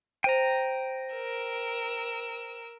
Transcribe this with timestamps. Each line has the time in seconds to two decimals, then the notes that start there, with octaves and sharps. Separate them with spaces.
0.24 C5 G5 A#5 D#7
1.14 A#4 E6